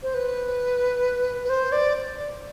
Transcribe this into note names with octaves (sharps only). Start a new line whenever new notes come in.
C5
B4
B4
C5
D5